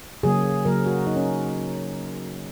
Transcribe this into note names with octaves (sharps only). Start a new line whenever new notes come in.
C#3 F#3 A#3 G#4
C#3 F#3 A#3 A#4
F#4
C#3 A#3 D#4
C#4